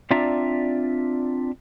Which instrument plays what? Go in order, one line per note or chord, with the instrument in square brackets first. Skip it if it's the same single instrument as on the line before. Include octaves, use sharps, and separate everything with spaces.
[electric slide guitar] C4 D4 F4 D5 E5 A#5